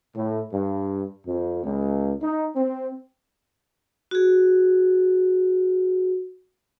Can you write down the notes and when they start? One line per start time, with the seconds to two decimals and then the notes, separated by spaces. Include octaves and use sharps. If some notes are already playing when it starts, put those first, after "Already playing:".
0.16 A2
0.53 G2
1.26 F2
1.64 C#2
2.22 D#4
2.56 C4
4.11 F#4 G#4